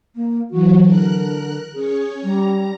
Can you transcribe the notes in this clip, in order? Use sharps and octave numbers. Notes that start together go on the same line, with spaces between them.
A#3
E3 F#3 F#4
D3 A#4 F#6
C#4 G#4 C#5
G3 A#5